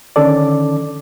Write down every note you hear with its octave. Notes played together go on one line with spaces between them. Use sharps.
D3 D#3 C#4 A4 D5